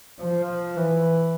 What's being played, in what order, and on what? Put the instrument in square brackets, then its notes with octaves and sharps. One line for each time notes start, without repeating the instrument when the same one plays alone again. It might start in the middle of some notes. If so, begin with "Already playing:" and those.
[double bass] F3
E3